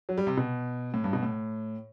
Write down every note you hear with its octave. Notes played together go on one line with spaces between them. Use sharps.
F#3
G3
C3
B2
A2
G2
B2
A2